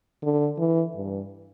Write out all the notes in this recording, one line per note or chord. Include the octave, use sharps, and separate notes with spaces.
D3
E3
G2